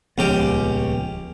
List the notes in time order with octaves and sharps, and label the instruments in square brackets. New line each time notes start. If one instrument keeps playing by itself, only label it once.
[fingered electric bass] D#1 F3 B3 [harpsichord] C#2 C#4 G4